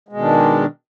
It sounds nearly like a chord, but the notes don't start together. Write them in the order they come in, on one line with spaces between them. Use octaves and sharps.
G#3 B2 D#3 D4